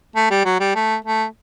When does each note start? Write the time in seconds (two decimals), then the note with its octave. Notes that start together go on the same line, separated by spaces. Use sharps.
0.16 A3
0.31 G3
0.45 F#3
0.60 G3
0.75 A3
1.05 A3